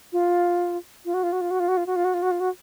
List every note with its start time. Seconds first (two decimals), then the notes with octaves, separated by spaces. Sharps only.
0.13 F4
1.05 F4
1.14 F#4
1.23 F4
1.33 F#4
1.41 F4
1.51 F#4
1.60 F4
1.68 F#4
1.77 F4
1.87 F#4
1.96 F4
2.05 F#4
2.14 F4
2.23 F#4
2.31 F4
2.40 F#4